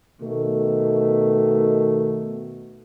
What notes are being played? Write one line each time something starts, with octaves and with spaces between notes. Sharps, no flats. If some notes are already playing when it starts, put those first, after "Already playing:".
B2 D#3 A3